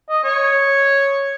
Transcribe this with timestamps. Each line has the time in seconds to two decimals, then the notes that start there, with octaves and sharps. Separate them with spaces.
0.10 D#5
0.24 C#5